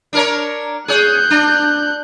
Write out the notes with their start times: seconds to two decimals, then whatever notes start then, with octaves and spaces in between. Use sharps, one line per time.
0.13 D4 A#4 C#5
0.88 G#4 C#5 F#6 G6
1.30 D4